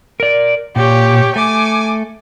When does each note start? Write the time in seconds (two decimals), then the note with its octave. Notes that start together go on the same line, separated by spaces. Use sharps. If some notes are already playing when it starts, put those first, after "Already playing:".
0.20 A#4 D5
0.76 A#2 G4 C#5
1.36 A3 G#5 D6